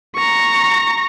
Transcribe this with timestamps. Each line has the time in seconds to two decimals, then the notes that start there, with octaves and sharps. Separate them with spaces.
0.16 A#5 C#6